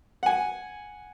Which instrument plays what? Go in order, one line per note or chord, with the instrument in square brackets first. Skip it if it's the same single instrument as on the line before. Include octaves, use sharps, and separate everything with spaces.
[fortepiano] F#5 G#5